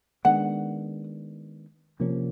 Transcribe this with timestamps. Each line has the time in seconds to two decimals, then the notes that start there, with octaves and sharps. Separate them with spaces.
0.25 D#3 G#3 B3 D4 F#5
2.00 C3 F3 A#3 C#4